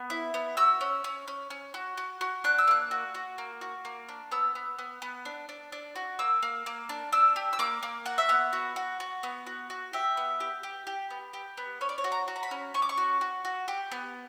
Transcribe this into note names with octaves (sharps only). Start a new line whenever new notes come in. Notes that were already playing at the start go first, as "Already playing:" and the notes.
Already playing: B3
E4
B3
F#4 E6
C#4
C#4
C#4
C#4
F#4
F#4
F#4
D4 F#6
E6
A#3 F#6
F#4
F#4
A#3
F#4
A#3
D4
B3 E6
B3
B3
B3
D4
D4
D4
F#4
A#3 E6
A#3
A#3
D4
D4 E6
G4
E6
A#3 D6
A#3
F#4 F#5
E5
B3 F#5
F#4
F#4
F#4
B3
F#4
F#4
G4 E5
B3
G4
G4
G4
B3
G4
B3
C#4 C#5
D5
C#5
F#4
A#5
F#4
A#5
B5
C#4
C#4 C#6
D6
C#6
F#4
F#4
F#4
G4
B3